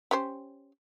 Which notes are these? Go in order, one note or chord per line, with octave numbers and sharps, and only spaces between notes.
C#4 G4 C5